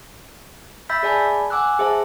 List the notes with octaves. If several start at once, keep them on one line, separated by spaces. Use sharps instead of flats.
E5 B5 E6 G6 A6 B6
G#4 D5 G#5 A5 B5
F#5 G#5 D6 E6 F#6
G#4 C5 E5 A5